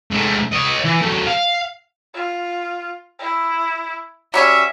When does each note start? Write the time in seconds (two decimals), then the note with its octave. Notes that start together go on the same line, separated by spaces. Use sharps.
0.11 G#2 A3
0.53 C#5 D#5
0.85 E3
1.02 F#3 A3
1.27 F5
2.14 F4
3.19 E4
4.34 F#3 G3 C#4 E5 E6